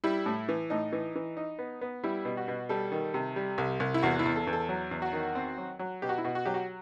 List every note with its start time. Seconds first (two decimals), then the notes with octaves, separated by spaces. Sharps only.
0.04 G3 E4
0.26 A2
0.49 E3
0.70 A2 D#4
0.92 E3
1.15 E3
1.37 D#4
1.59 B3
1.81 B3
2.04 G3 E4
2.25 B2
2.37 F#4
2.48 B2
2.69 G3 A4
2.92 D#3
3.14 C3
3.36 G3
3.58 C2
3.80 C2
3.94 E4
4.02 E2 F#4
4.19 E4
4.25 E2
4.36 A4
4.47 E2
4.53 A4
4.69 F#3
4.91 E2
5.02 F#4
5.13 D#3
5.35 C4
5.58 F#3
5.79 F#3
6.02 B2 G4
6.09 F#4
6.18 E4
6.24 B2 F#4
6.35 F#4
6.45 F#3 G4
6.54 F#4